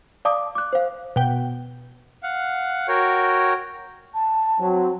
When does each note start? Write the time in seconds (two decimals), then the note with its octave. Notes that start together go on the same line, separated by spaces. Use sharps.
0.25 D5 F5 A5 D6 D#6
0.55 D6 F#6
0.73 C5 F5
1.16 B2 G5
2.23 F5 F#5
2.88 F#4 A#4 C#5 G5
4.14 A5
4.59 F#3 C4